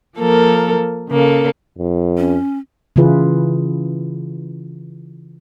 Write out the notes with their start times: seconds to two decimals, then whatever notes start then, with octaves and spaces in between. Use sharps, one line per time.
0.16 F3 A#3 A4 A#4
1.09 C#3 A#3 A4
1.79 F2
2.17 C#4
2.96 C#3 E3 E4 F4 G#4 B4